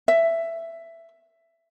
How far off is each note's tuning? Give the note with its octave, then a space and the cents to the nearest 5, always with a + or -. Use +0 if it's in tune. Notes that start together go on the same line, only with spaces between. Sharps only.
E5 +10